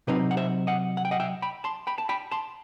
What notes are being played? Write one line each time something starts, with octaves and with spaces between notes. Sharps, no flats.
C3 F#3 C4 D#4 B4 D#5
F#5
C5 E5
D#5 F#5
F#5
G5
D#5 F#5
E5 G5
G5 B5
A5 C6
G5 B5
A5
G5 B5
A5 C6